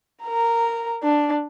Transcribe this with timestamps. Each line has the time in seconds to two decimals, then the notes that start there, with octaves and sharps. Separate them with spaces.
0.23 A#4 A#5
1.03 D4